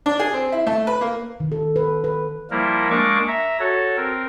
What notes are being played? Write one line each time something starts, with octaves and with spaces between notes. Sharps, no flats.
D4
G#4
C4
E4
A3
B4
A#3
D#3
A4
B4
B4
F3 G3 A#3 E4 A#4
G#3 A#3 D4 A#4 C#6 D6
E5 A#5
F#4 A4 C#5
C4 A#4